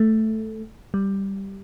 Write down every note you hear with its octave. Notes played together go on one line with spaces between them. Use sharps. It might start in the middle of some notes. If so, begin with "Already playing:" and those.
Already playing: A3
G3